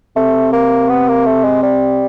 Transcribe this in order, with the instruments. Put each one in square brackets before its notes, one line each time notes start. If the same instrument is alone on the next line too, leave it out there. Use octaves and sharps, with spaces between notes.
[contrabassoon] C3 [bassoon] A3
[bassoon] A#3
B3
A#3
A3
G#3
G3